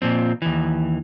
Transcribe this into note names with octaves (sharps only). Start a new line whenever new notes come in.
A#2 F3 C4
D#2 E3